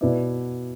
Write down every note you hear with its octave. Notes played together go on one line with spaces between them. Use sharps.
B2 B3 E4 B4 D5